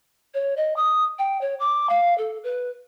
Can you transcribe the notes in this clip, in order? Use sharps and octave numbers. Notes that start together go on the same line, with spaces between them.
C#5
D#5
D#6
G5
C#5
D6
F5
A4
B4